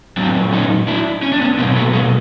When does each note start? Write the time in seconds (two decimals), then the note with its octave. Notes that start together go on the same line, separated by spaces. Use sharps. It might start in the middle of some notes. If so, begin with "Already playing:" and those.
0.17 A#2 F#3 C4 D4
0.53 C#4 D#4
0.88 D4 E4
1.22 C#4
1.32 D4
1.40 B3 C#4
1.58 B2 F#3 A#3 C4
1.76 A3 B3
1.93 G#3 A#3